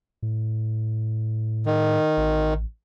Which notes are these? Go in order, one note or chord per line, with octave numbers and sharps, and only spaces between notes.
A2
D#3
A1